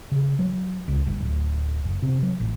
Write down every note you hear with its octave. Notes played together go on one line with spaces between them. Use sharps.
C#3
F#3
C#2
G1
D1
F#1
C3
F#3
A1